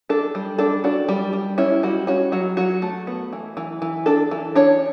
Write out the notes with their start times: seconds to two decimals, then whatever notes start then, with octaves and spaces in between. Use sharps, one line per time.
0.09 D4 A4
0.35 G3
0.58 D4 A4
0.84 D4 F#4
1.09 G3
1.33 G3
1.58 C#4 E4
1.83 G3 F#4
2.07 C#4 F#4
2.32 F#3 F#4
2.57 F#3 F#4
2.82 A3
3.07 B3
3.33 E3
3.57 E3
3.82 E3
4.06 D4 A4
4.31 E3
4.55 D4 C#5